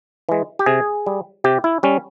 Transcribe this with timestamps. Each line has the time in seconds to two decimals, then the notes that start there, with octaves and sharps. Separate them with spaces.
0.29 E3 G#3
0.59 G4
0.66 C3 G#4
1.07 G3
1.44 C3 G4
1.64 E4
1.83 G3 C#4